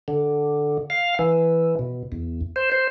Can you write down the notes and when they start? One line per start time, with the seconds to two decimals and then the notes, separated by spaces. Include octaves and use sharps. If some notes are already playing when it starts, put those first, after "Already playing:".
0.08 D3
0.90 F5
1.19 E3
1.79 B2
2.12 E2
2.56 C5
2.72 C5